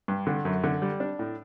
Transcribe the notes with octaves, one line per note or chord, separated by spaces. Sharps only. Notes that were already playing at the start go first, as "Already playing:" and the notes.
G2
D3
F#2
D3
G3
D4
A2